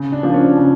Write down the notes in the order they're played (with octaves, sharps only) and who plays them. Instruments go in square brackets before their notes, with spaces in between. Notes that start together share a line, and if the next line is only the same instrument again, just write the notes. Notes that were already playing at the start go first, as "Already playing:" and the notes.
Already playing: [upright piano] C#3
[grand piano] D4
[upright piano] F3 A#3 D4 F4
[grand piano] C#4
[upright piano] C#3